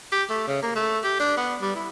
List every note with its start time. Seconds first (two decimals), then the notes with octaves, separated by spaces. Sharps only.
0.12 G4
0.30 A3
0.47 C#3
0.62 A#3
0.76 A3
1.04 G4
1.20 D4
1.37 B3
1.61 G3
1.75 E4